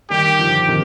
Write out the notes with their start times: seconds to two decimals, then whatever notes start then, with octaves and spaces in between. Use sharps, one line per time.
0.10 D#3 G3 G4
0.39 D3 F3
0.68 C3 D#3